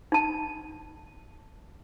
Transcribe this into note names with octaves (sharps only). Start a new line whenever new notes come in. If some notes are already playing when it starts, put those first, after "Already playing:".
D#4 A5